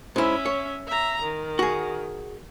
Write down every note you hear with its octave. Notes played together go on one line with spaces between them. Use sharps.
G#2 C#4 E4 E5
C#5
E5 A#5
D#3
F#4 G#4